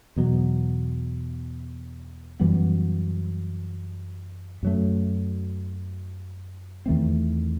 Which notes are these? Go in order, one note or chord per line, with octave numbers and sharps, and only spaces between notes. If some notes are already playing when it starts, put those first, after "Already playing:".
E2 B2 F#3
F#2 E3 G3 B3
F#2 F#3 A3
E2 D#3 A3 C4